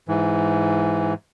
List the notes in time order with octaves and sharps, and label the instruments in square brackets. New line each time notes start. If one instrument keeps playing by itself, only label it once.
[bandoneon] G#2 E3